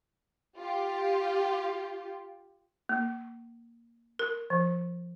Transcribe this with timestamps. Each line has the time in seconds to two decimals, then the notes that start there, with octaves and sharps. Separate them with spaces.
0.57 F4 G4
2.89 A#3
4.19 A#4
4.50 F3